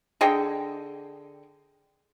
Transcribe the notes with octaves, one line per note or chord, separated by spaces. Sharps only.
D3 G#4 D#5 G5